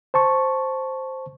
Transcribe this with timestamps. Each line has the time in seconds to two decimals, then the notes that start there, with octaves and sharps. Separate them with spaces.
0.14 C5 A5 C#6